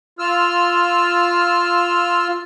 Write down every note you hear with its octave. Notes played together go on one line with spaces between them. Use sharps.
F4 E6 F6